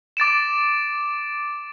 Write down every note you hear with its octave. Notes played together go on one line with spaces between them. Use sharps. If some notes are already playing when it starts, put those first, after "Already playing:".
D6 A6 D7 E7